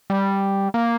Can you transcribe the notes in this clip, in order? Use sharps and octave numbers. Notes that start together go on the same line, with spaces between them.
G3
A#3